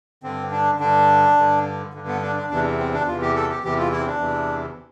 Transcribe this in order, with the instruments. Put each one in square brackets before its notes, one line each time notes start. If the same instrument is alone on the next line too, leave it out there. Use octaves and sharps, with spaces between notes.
[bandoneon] G2 D3 C4
D4
G2 D3 D4
G2 D3
G2 D3
B3
D4
D4
E2 C3 E3 D4
C4
D4
E2 C3 E3 F4
G4
A4
G4
E2 C3 E3 G4
F4
E4
C4
D4
E2 C3 E3